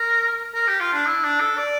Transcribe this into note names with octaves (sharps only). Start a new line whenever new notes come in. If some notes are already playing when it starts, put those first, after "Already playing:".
Already playing: A#4
A#4
G4
F4
D4
E4
D4
A4
D5